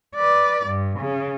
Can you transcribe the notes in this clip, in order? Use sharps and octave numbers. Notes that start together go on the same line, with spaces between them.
B4 D5
G2
C#3